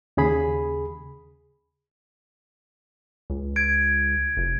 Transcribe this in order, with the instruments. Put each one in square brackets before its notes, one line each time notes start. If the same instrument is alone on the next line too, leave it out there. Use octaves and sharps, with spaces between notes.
[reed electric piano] D#2 C#3 G#4 B5
[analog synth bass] C#2
[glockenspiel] G#6 D7
[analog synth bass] F1